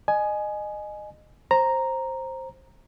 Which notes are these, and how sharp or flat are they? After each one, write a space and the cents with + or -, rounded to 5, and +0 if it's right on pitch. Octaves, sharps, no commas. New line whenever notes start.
D#5 -25 G#5 +15
C5 +15 A#5 +0